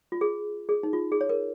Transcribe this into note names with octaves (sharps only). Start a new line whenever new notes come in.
F4
G#4
G#4
D#4
F4
G#4
C#5
A#4